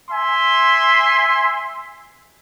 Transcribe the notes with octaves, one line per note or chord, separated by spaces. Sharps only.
E5 G#5 C6